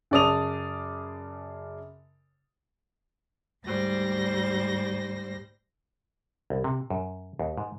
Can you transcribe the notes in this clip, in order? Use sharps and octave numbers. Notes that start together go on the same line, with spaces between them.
F#2 C#3 D5 A5 D#6 F7
D2 G#2 G3 C5 A#6
C2
C3
F#2
D#2
G#2